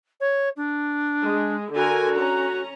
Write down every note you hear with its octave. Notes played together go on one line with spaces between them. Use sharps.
C#5
D4
G#3
D3 F#4 A#4 G#5
C#4 A#5